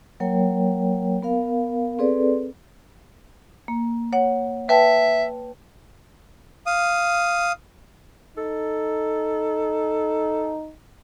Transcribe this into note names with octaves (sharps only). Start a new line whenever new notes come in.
F#3 A#3 A#4 C#5 G5
B3 A#4 F5
C4 G#4 A4 B4 D5
A#3
C#5 F#5
B4 E5 G5 A5
F5 D#6
D#4 A4